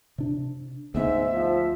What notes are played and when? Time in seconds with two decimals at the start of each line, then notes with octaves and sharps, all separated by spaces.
0.18 C3 D4
0.95 D2 G#2 B3 E5
1.34 F3